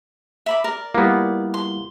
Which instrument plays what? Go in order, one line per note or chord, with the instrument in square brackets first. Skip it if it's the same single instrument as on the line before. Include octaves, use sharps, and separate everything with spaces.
[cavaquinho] E5 B5 D6
A#4 D5
[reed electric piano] G3 E4 F4 [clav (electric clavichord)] A#3 B3
[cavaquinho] C6